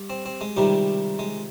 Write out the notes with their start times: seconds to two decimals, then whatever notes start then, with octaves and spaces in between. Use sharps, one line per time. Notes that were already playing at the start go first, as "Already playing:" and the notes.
Already playing: G2
0.10 C4
0.26 C4
0.41 G#3
0.57 C#2 C3 D#3 G3
1.19 G#3